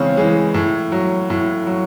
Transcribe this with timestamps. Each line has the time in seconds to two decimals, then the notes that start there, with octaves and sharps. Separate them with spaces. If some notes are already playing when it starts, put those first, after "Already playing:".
Already playing: C#3 E3 G#3 C4 C#4
0.17 E3 G#3
0.54 A2
0.92 F#3
1.30 A2
1.67 F#3